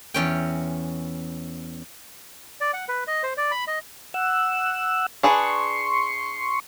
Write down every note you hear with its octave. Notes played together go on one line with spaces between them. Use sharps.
E2 C#4 G5
D5
F#5
B4
D#5
C5
D5
B5
D#5
F#5 E6
D4 G#4 B4 C6 C#6